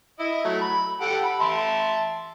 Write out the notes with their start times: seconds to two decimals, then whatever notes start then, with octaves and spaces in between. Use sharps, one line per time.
0.19 E4 D#5
0.44 F#3 A3
0.61 B5
1.01 G4 A4 F#5
1.25 B5
1.40 E5 A5 C6